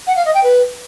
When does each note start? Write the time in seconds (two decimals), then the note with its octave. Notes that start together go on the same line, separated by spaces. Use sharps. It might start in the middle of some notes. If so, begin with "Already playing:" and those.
0.07 F#5
0.16 F5
0.25 D#5
0.34 G5
0.43 B4